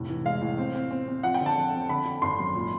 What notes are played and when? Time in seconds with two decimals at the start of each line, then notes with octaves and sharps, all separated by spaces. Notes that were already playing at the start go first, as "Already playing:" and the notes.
Already playing: F1 A2
0.09 E3
0.25 G#3 F5
0.41 A2
0.58 C4
0.75 C4
0.91 C4
1.08 C4
1.23 F3 F#5
1.34 G5
1.41 D3
1.46 A5
1.57 F2
1.74 F2
1.89 D3 B5
2.06 D3
2.22 G#1 C6
2.39 F#2
2.55 A#2